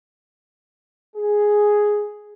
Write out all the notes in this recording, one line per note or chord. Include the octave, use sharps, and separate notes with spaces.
G#4